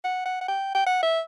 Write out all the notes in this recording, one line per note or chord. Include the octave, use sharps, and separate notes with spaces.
F#5
F#5
F#5
G5
G5
F#5
E5